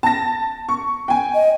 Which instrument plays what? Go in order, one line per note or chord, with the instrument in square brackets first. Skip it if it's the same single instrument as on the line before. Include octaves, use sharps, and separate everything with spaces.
[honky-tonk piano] A5 A#6
C#6
G5 G#5
[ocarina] D#5